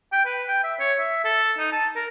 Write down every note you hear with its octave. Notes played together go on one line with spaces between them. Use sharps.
G5
B4
G5
E5
C#5
E5
A4
D#4
A5
A#4